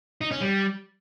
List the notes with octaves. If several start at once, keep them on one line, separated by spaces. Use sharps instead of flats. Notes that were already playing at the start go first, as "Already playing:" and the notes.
D#4
C#4
G3